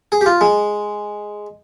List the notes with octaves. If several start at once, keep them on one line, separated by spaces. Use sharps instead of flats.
G#4
G4
F4
G#3